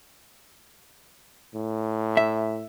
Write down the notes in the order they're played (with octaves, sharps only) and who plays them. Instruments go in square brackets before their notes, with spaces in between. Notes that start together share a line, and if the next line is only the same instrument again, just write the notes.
[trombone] A2
[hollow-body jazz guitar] E5